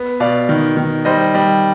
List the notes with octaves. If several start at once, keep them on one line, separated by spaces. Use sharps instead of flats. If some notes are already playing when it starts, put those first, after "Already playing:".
Already playing: B3
B2 D5 F5
D#3
D#3
G3 C5 D#5
G3